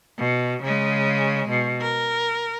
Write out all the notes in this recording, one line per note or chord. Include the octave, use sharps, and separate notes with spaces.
B2
C#3 G#3
B2
A#4